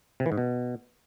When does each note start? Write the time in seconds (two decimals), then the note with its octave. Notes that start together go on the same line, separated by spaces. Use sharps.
0.20 C3
0.26 E3
0.32 G#2
0.37 B2